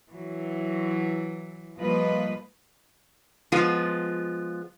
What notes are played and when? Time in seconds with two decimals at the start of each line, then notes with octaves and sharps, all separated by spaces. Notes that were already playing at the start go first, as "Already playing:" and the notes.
0.12 E3 F#3
1.78 F3 G3 A#3 F4 B4 D#5
3.52 F3 G#3 B3 F4